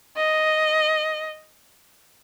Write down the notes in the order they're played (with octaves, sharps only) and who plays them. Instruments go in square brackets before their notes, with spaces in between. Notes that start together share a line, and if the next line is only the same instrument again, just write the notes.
[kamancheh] D#5